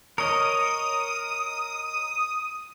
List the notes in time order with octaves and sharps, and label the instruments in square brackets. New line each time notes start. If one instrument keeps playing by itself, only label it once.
[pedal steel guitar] A#4 C#5 D#5 [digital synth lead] D#6